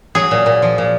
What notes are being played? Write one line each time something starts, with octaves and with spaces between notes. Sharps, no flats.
F#3 G#4
A#2
A#2
F3
A#2